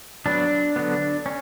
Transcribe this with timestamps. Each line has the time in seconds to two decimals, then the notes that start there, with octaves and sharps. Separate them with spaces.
0.26 F#3 B3 D4
0.76 D3 F#3 B3
1.26 C#4